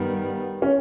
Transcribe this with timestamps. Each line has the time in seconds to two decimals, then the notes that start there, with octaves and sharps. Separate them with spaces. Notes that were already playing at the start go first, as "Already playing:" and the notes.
Already playing: G2 D#3 G3 B3
0.62 C#4